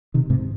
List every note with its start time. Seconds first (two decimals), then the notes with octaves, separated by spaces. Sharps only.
0.14 C3 D#3
0.30 G#2 C3